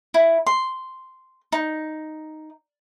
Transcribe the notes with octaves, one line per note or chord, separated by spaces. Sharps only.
E4
C6
D#4